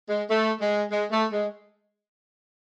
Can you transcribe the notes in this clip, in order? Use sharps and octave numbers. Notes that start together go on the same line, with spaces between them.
G#3
A3
G#3
G#3
A3
G#3